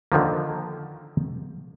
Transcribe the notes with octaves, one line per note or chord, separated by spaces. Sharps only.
D3 D#3 F3 A#3